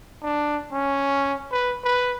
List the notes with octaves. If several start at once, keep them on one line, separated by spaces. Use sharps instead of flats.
D4
C#4
B4
B4